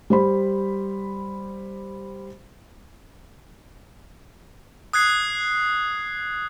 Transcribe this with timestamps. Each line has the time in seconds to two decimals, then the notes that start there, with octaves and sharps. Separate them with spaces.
0.10 G3 C5 B5
4.93 D#6 F#6 G#6 C7